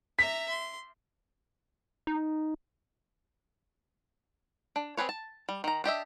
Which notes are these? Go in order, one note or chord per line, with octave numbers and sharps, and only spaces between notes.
E5 A#5 B6
C6
D#4
D4
C4 F4 G#4 B4 C#5
A5
G3
D#3 A#5
D4 G4 D#5 E5